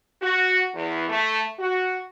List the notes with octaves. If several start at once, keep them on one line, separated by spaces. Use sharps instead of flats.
F#4
E2
A3
F#4